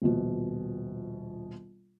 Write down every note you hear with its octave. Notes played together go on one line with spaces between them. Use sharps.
D#1 A#1 B2